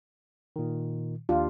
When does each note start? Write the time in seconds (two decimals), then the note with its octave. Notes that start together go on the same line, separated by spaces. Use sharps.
0.56 A#2 D#3
1.29 D#2 D4 F4 G4